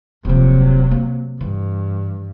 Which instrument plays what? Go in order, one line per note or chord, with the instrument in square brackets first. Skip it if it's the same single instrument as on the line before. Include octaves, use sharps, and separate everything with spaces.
[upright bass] D#1 F3 [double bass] C3 F#3
[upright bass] A#3
[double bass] G2 [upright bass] E3